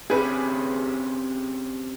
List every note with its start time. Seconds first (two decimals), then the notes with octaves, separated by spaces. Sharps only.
0.10 C4 C#4 G4 G#4 B4